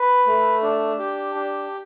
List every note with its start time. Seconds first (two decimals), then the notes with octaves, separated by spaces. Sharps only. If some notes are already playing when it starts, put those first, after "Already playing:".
Already playing: B4
0.26 A3
0.62 D4
0.99 G4
1.35 D4